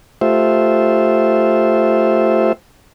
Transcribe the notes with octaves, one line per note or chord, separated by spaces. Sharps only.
A3 F4 G4 C5 E5